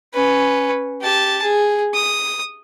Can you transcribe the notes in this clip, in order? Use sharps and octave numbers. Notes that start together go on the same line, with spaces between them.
C#4 B4
G4 A5
G#4
D#6